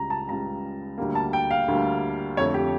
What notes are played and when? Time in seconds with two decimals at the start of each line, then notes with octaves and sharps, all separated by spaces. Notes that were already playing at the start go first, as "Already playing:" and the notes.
Already playing: C#2 C#3 G3 A#5
0.10 A5
0.28 C#2 C#3 G3 A#5
0.98 D2 D3 G3 A#3
1.15 A5
1.33 G5
1.51 F5
1.68 D2 D3 G3 A#3
2.37 F2 D3 A3 C#5
2.54 G4